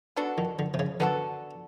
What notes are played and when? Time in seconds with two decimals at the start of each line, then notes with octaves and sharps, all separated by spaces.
0.16 B3 D4 F#4 A4
0.38 D#3
0.59 D3
0.74 C3
0.79 C#3
1.00 D3 B3 D4 F#4 A4